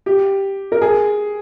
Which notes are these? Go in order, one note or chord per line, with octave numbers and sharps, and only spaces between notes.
G4
A#4
G#4